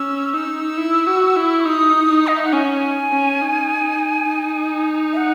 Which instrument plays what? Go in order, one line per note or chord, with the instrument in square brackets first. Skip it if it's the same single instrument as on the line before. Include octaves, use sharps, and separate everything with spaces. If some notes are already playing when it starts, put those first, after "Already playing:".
Already playing: [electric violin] C#4 [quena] E6
[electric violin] D#4 [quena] E6
[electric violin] E4
F#4
E4
[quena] C#6
[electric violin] D#4 [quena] D#6
[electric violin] D#4
[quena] D#5
E5
F#5
[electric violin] C#4 [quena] G#5
[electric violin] C#4
D#4
D#4
[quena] E5
F#5